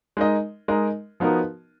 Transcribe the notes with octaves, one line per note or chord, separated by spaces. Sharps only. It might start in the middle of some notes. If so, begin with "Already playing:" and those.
G#3 D#4 A#4 D#5
G#3 D#4 A#4 D#5
F3 B3 D#4 F#4 A#4